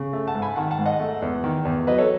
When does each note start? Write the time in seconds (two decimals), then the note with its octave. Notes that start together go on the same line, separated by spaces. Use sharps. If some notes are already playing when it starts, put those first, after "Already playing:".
Already playing: C#3
0.13 A3
0.27 F#5 A5
0.35 G#2
0.42 G#5 B5
0.56 D#3 F#5 A5
0.71 F#5 A5
0.79 G#2
0.86 D#5 F#5
1.00 A3
1.22 E2
1.44 D#3
1.65 E2
1.87 F#3 B4 D#5
1.98 A4 C#5